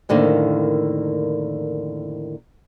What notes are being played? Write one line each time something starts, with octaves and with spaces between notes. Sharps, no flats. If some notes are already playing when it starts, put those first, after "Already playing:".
F2 A2 D3 D#3 A#3